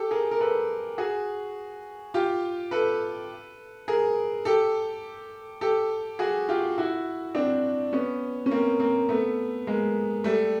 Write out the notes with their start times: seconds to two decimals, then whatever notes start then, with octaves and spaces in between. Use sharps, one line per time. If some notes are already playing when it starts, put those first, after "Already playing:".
Already playing: G4 A4
0.11 G#4 A#4
0.31 A#4
0.40 A4 B4
0.98 F#4 G#4
2.14 F4 G4
2.71 A4 B4
3.88 G#4 A#4
4.45 G4 A4
5.61 G4 A4
6.19 F#4 G#4
6.49 F4 G4
6.78 E4 F#4
7.35 C4 D4
7.93 B3 C#4
8.46 C#4
8.51 A#3 C4
8.79 A#3 C4
9.09 A3 B3
9.67 G#3 A#3
10.24 G3 A3